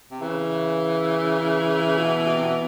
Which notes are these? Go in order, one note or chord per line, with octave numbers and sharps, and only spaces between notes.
C3
C#3 E3
B2
B2
C3
B2